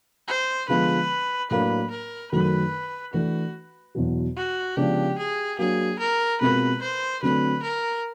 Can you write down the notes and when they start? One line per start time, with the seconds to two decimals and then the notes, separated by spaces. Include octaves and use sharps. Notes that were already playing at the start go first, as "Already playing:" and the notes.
0.28 C5
0.68 D3 F3 G#3 B3 B4
1.51 A2 F#3 A#3 D4 B4
1.90 A#4
2.31 F#2 D#3 F#3 A3 B4
3.13 E3 A3 D4 F#4
3.95 E2 B2 F#3
4.36 F#4
4.76 C#3 F3 G#3 B3 D4 G4
5.18 G#4
5.58 F#3 A#3 D4 G#4
5.99 A#4
6.41 B2 G#3 C4 F4 A#4 B4
6.82 C5
7.22 D3 F#3 A3 C4 B4
7.63 A#4